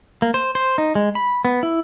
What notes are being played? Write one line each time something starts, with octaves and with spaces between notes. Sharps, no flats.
A#3
C5
C5
D#4
G#3
B5
B3
E4